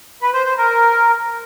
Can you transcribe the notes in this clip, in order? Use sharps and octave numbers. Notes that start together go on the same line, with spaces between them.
B4
C5
C5
A#4